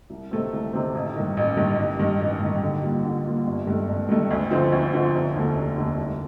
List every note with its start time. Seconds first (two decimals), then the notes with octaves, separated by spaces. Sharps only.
0.10 C2
0.31 C3 D#3 A3 C4
0.53 C2
0.73 C3 D#3 A3 C4
0.95 A1
1.16 G2 D#3
1.37 A1
1.57 G2 D#3
1.78 A1
1.99 G2 D#3
2.20 A1
2.42 G2 D#3
2.62 D3
2.83 G3 A#3 F4
3.05 D3
3.26 G3 A#3 F4
3.47 G1
3.67 G2 D#3 A3
3.88 G1
4.09 G2 D#3 A3
4.31 D2
4.51 D3 F3 C4 D#4
4.72 D2
4.93 D3 F3 C4 D#4
5.14 F1
5.36 D#2 D3 A3
5.56 F1
5.77 D#2 D3 A3
5.98 C2